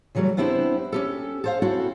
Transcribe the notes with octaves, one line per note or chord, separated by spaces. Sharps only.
C#3 E3 F#3 G3 A3
B3 C4 D4 E4 G4 C5
C#4 G4 A4
A4 C5 F5
C4 C#4 E4 F#4 A4